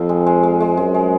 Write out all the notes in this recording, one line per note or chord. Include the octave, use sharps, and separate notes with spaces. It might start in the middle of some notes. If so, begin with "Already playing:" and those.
Already playing: F2 F3 C4 F4
G#3
G#3
G#3
G#3
F#2 G#3
G#3